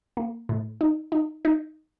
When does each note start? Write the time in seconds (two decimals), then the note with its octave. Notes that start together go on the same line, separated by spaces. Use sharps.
0.17 A#3
0.49 A2
0.81 D#4
1.12 D#4
1.45 D#4